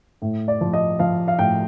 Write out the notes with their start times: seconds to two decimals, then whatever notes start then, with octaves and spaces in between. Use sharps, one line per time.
0.22 A2
0.48 D5
0.61 F3
0.73 D#5
0.99 F3 F5
1.28 F5
1.39 A2 G5